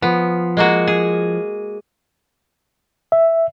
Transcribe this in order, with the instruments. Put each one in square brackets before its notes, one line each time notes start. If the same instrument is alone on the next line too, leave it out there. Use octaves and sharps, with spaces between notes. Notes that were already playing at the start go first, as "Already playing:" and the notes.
[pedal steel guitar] F3 [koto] B3
[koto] G#3 A#3 F#4
G#4
[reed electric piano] E5